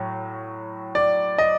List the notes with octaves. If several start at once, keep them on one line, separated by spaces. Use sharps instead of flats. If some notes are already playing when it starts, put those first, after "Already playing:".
Already playing: A2 F#3
D5
D#5